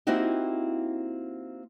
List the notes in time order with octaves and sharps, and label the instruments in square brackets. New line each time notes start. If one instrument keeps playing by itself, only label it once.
[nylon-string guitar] A#3 C4 D#4 E4 F#4 G4